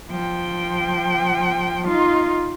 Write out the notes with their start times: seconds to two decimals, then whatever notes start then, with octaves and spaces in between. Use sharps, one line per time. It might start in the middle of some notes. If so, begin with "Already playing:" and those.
0.11 F3 G5
1.87 D#4 F4